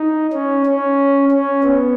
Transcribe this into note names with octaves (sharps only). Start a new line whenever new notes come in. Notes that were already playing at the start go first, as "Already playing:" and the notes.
Already playing: D#4
C#4
C#4
C#4
B3